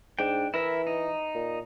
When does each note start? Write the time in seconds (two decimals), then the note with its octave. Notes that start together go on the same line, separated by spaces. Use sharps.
0.19 G#2 D4 G5
0.54 E3 E4 A#4 E5
0.87 D#4
1.35 A#2